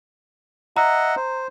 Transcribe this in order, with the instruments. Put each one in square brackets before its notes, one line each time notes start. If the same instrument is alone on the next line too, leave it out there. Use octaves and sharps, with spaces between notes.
[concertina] D#5 E5 F#5 [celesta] A#5
[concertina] C5